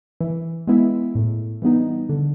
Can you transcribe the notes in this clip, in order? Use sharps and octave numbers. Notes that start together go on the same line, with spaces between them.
E3
G#3 B3 E4
A2
E3 G3 B3 D#4
D3